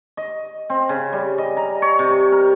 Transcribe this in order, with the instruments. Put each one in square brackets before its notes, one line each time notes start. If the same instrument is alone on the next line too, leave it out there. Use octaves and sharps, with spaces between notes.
[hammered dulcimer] D#5
C4
C#3
G3
D#5
A#5
C#5
C3
A#4